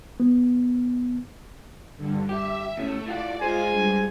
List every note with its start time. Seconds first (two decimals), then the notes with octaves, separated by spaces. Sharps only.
0.20 B3
1.97 G2 D3
2.29 G4 E5
2.77 E2 A3 C#4
3.06 A2 F4 D5 F#5
3.41 G#3 F4 G#4 C5 G#5
3.71 G2